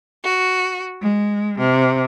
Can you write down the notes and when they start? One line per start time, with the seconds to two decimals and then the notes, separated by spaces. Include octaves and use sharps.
0.24 F#4
1.01 G#3
1.58 C3